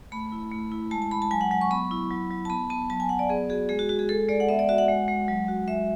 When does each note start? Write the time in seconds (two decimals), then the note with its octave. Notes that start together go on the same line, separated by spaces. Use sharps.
0.12 A3 B5
0.32 E4
0.51 A3
0.71 E4
0.91 G#3 A5
1.02 A5
1.11 G#3 B5
1.22 A5
1.31 F#3 G#5
1.41 F#5
1.51 F#3 F#5
1.61 C#6
1.71 B3 B5
1.91 E4
2.11 F#3
2.31 F#3
2.45 A5
2.50 B3 B5
2.70 B3 A5
2.90 F#3 A5
3.00 G#5
3.09 F#3 F#5
3.19 D5
3.29 B3 G#4
3.49 F#4 G#4
3.69 G#3 G#4
3.79 F#4
3.89 G#3 F#4
3.99 G#4
4.09 G#3 A4
4.29 G#3 D5
4.40 F#5
4.49 B3 E5
4.59 D5
4.69 F#4 E5
4.78 F#5
4.88 G#3
5.08 G#3
5.28 F#3
5.48 F#4
5.68 G#3 E5